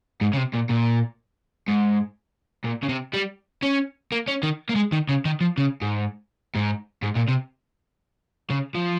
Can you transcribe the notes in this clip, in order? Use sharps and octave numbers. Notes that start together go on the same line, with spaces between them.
G#2
C#3
C3
A#2
A#2
G#2
A#2
C#3
C3
G3
C#4
A#3
C#4
D#3
A#3
G#3
D#3
C#3
D#3
F3
C#3
G#2
G#2
G#2
A#2
C3
C#3
F3